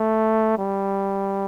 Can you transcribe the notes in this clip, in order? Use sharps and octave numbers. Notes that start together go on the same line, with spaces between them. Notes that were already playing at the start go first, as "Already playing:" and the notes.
Already playing: A3
G3